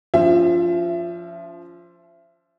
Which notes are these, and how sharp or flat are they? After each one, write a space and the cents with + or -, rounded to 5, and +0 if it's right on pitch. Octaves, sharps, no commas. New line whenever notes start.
F3 +0 C#4 +45 E5 +25